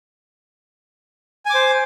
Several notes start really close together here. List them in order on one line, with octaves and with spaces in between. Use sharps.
G#5 D6 C5